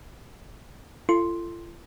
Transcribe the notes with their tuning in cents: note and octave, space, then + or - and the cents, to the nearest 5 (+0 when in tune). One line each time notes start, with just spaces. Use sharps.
F4 -40 A4 +10 C6 +0